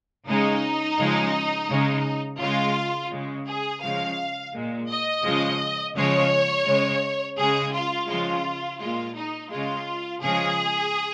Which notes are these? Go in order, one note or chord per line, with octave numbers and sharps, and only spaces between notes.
C#3 G#3 D#4
C#3 F3 G#3
C#3 G#3
C#3 G#3 F4
C#3 G#3
G#4
C#3 F3 G#3 F5
A#2 G#3
D#5
C#3 F3 G#3
C#3 F3 G#3 C#5
C#3 G#3
C#3 G#3 G#4
F4
C#3 F3 G#3 F4
A#2 G#3 F4
D#4
C#3 G#3 F4
C#3 F3 G#3 G#4